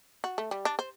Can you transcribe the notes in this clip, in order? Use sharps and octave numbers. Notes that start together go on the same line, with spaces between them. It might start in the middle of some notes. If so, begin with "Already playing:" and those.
F#4
A3
G3
D4
C5